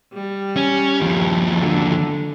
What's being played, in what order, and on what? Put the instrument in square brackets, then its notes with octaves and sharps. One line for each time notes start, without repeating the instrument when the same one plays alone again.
[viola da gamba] G3
[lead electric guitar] C#4
D#2 F3
[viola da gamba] D3